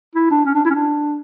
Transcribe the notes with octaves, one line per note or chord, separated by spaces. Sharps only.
E4
D4
C#4
D4
E4
C#4
D4